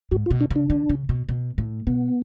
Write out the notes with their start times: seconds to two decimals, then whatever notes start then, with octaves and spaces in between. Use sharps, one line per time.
0.11 G#2 F#4
0.26 F4
0.31 B2
0.41 D4
0.50 C#3
0.56 D4
0.70 D3
0.89 C#3
1.09 B2
1.29 B2
1.58 A2
1.87 B2 B3